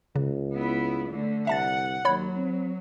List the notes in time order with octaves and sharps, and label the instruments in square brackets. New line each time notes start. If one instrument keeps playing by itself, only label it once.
[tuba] C#2 [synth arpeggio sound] C#3
[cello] B3 E4
D3 A3
[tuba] C2 [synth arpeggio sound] E5 A5 A6 [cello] F#5
[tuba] D#2 [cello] F#3 [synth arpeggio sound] C#5 B5 G#6
[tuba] C4